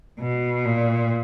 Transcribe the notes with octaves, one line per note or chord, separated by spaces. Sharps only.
B2
A#2